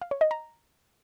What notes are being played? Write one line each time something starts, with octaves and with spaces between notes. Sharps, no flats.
F5
C#5
D#5
A#5